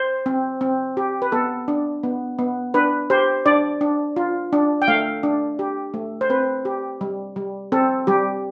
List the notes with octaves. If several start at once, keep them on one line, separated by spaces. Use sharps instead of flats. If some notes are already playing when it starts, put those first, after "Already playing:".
Already playing: C5
C4
C4
G4
B4
B3 A4
D4
B3
B3
D4 B4
G4 C5
D4 D5
D4
F4
D4
G5
A3 F5
D4
G4
A3
C5
C4 B4
G4
G3
G3
C4 A4
G3 G4